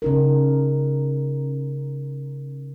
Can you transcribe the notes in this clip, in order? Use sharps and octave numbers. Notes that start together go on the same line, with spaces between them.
C#3 D#4 A#4